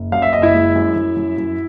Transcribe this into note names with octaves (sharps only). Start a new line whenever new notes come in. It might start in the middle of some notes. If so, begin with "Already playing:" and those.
Already playing: F#1
F#2 F5
E5
F#1 D#5
E4 E5
G#3
F#2
F#2
F#2
F#2